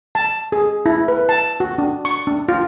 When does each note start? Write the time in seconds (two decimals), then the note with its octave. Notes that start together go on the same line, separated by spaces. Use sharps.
0.15 A5
0.52 G#4
0.86 E4
1.08 B4
1.29 A5
1.60 F#4
1.78 D4
2.05 C#6
2.27 D4
2.49 F4